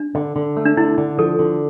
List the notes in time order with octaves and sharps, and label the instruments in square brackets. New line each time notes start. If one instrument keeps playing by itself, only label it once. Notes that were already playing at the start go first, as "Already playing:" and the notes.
Already playing: [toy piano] D4
[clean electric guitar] D3
D3
A3
[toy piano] D4
[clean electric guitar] D3 [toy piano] E4
[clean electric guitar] D3
[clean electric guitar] F3 [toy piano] A4
[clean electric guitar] D3